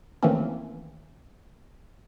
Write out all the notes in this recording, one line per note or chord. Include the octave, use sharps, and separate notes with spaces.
D#3 E3 A3 A#3 C4 C#4